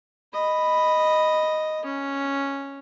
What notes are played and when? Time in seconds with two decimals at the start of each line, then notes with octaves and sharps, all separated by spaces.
0.33 D#5 B5
1.85 C#4